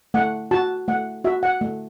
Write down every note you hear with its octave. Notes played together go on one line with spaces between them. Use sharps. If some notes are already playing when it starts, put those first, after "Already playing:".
A3 F#5
F#4 A5
A3 F#5
F#4 E5
F#5
A3